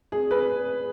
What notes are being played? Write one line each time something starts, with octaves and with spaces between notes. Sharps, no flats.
G#4
B4